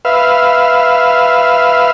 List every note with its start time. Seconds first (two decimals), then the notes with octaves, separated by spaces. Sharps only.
0.05 B4 E5 F5